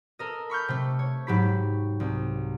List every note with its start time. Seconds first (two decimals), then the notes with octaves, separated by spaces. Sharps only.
0.19 A4 A#4 D#5
0.50 B5 C#6 F6 G6
0.68 C3 A3
0.99 C#5
1.27 G#2 F#3 G4 B5 B6
2.00 C2